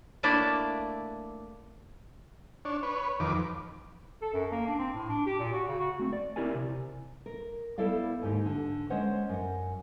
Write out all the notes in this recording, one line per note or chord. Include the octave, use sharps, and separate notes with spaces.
A3 A#3 D4 E4 D5 E5
D4 C#5
B4 C#5
F2 D#3 B4 D6
A4
F#2
A#3
D4
C4
A2
D4
G4
A#2
F#4
C#3
F#4
A3 C4
D5
C4 E4 G4 A#4 D5 G#5
C3
A#4
G3 B3 E4 A4 D5 F5
D#2 G#2 D#4 G4
D3
G#3 C#4 C5 C#5 F#5
F#2 F#5